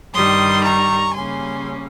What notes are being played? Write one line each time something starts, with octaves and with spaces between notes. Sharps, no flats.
G2 D#3 G3 C6 D#6
A#5 C#6
C#3 G3 A#3 C#4 G#5 C6